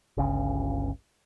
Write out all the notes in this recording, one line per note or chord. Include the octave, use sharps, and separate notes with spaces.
G1 C#2 C#3